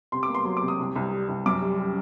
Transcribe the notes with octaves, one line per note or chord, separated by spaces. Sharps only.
C3 C6
D6
A#3
C6
F#3 C6
D6
C3
D#6
C2
C2
G3
C2
F#2 D6
G3
G3